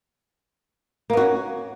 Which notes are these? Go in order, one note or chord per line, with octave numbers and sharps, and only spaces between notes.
A#3 B3 C#4 F#4